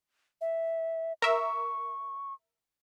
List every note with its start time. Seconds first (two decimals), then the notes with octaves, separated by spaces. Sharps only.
0.41 E5
1.22 A#4 E5 C#6